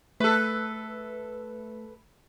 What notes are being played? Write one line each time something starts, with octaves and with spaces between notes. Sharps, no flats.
A3 A4 B4